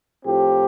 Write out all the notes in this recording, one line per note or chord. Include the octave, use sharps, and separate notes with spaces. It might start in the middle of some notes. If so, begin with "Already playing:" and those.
A2 F3 C4 G4